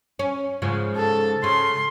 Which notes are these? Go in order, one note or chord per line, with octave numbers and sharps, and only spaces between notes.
C#4
G#2 C#3 F3
A4
C#3 C6